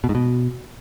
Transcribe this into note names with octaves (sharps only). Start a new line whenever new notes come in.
B2
G#2
B2